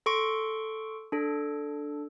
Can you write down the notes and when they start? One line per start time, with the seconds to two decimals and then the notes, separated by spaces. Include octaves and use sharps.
0.06 A4 C6 C#6 D7
1.12 D4 A4